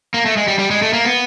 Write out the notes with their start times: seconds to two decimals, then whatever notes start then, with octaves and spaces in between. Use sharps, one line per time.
0.14 A#3
0.26 A3
0.37 G#3
0.48 G3
0.59 G3
0.71 G#3
0.82 A3
0.93 A#3
1.05 B3